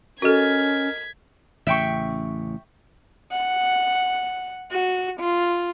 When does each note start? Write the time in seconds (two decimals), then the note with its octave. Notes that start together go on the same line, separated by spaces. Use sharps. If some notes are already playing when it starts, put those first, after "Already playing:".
0.22 C#4 F#4 A4 A#4 D#5 F6 G#6 B6
1.67 A1 C#3 E5 G5 C#6
3.31 F#5
4.72 F#4
5.20 F4